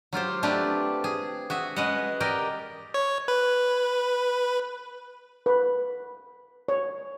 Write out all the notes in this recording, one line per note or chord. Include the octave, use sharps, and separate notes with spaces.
F#3 F4 G4 C5
A3 C4 D4 G4 B4 A5
G#4
F#4 G#4 E5
G#3 C#4 B4 D#5 F#5
G4 A#4 D5 D#5 G5
C#5
B4
B4
C#5